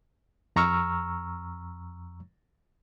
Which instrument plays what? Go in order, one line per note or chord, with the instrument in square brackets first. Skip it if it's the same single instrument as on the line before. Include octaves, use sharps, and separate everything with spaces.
[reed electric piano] F2 A#5 C#6 E6 F6